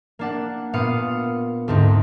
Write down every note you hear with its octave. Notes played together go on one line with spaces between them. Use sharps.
A#3 D4 F#5
A#2 B3 F5 D#6 C#7
D2 G#2 C4 D#4